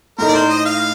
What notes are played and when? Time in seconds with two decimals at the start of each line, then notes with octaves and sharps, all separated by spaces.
0.18 A2 A3 D#4 A#4
0.28 D5
0.34 C5
0.50 D#5
0.65 F5